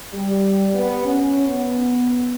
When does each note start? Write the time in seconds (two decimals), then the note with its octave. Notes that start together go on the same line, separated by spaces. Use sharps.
0.13 G3
0.74 B3
1.05 C#4
1.48 B3